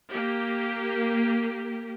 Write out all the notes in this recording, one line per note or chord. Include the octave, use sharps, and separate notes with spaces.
A#3 G4